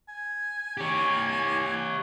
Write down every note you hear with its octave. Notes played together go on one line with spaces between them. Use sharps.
G#5
G4 C#5